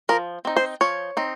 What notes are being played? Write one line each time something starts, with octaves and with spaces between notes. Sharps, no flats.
F3 A#4
C4 D#4
C5
F3 C#5
C4 D#4